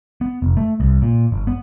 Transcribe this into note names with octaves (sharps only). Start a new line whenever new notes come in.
B3
F1
A3
C2
A#2
G1
B3